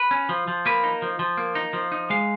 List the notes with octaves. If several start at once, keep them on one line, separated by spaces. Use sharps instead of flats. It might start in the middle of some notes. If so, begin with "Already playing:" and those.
Already playing: B4
C#4
F3
F3
A#3 B4
D#4
F3
F3
A#3
D#4
F3
D#4
G#3 F5